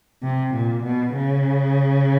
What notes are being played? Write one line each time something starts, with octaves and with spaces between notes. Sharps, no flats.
C3
A#2
B2
C#3